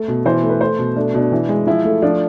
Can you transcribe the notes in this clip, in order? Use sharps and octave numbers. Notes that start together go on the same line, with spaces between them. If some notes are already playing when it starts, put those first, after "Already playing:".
Already playing: A3
B2
E3 C5
A3
B4
A3 C5
B2
A3 D4
B2 D4
E3
G#3
F3 E4
A3
F3 D4